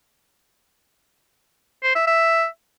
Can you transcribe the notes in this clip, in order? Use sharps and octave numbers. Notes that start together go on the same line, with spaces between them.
C5
E5
E5